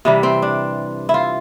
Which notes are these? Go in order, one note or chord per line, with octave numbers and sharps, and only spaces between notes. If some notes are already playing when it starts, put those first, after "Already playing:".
C3 E3 G3
C4
D4
E4
F4